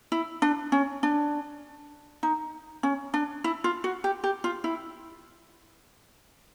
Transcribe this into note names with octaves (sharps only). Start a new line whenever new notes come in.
E4
D4
C#4
D4
D#4
C#4
D4
E4
F4
F#4
G4
G4
F4
E4